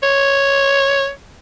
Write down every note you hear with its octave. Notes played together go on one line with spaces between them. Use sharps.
C#5